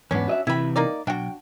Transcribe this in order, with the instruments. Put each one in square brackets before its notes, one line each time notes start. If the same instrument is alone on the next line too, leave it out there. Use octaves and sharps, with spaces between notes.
[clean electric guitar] E2 G#2 B3 [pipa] C#4 D4
[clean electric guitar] F#4 D#5 E5
[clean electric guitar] C3 E3 G5 [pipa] E4 B5
[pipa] A#3 D#4 D5
[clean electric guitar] B1 G5 [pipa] D4 F#4